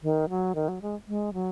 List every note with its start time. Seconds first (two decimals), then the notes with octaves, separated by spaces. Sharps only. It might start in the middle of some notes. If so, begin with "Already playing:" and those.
0.03 D#3
0.29 F#3
0.55 D#3
0.68 F#3
0.82 G#3
1.08 G#3
1.34 F#3